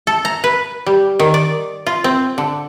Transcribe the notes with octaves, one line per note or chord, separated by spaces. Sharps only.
A4
A#5
B4
G3
D#3
D5
F4
C4
D3